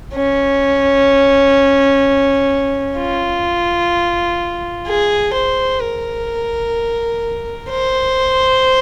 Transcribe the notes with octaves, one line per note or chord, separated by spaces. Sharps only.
C#4
F4
G#4
C5
A#4
C5